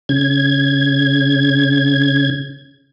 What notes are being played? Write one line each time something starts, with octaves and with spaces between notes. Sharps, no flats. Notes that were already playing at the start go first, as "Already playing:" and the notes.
C#3 G#6